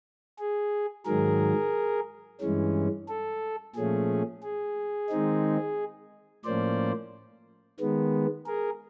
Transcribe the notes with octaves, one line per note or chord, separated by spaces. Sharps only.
G#4
G#2 D#3 F#3 G#4 A#4
G2 E3 G#3 C#4
A4
A#2 F3 A3 C#4 G#4
G#4
D#3 G#3 C4 D#4
A2 F3 A#3 C#4 C5 D5
D#3 G#3 B3
G#4 A#4